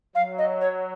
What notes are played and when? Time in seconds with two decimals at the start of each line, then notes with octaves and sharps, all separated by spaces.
0.15 F#3 F5
0.38 D#5
0.61 C#5